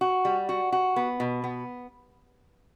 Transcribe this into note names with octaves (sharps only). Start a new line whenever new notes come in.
F#4
G3
F#4
F#4
B3
B2
B3